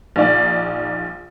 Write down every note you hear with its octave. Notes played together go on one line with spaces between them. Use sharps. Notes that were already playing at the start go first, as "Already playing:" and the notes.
A#1 D#4 D5 F5